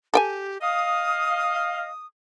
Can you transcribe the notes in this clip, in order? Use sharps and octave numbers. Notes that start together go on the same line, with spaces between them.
G4 A4 G5 G#5
D#5 F5 D#6